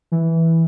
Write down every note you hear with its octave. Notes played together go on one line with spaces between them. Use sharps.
E3